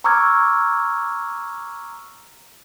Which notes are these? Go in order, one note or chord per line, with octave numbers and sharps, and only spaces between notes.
A#5 C#6 D6 E6 F6 G#6